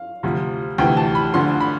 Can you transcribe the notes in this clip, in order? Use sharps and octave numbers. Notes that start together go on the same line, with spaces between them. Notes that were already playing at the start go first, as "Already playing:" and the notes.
Already playing: F5
D2 C3 F3
D2 C3 E3 G5
A5
B5
D2 D3 F3 C6
B5